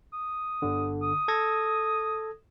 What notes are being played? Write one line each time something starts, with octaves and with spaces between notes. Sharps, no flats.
D#6
G1 D3
D#6
A4 G#6 A#6